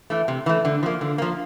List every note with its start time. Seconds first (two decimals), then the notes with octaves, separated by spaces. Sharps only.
0.10 E3 A3
0.28 C3
0.46 E3 A3
0.65 D3
0.83 F3 A#3
1.01 D3
1.18 F3 A#3